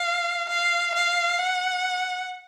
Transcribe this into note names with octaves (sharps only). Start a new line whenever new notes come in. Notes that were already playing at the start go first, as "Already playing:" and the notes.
Already playing: F5
F5
F5
F#5